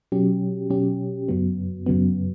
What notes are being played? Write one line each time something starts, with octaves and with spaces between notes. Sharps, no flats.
B2 F#3 C#4 G4
B2 F#3 C#4 G4
F#2 C#3 F#3 B3
F#2 C#3 F#3 B3